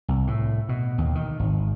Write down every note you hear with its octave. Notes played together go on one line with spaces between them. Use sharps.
C2
A2
B2
D#2
D#3
G#1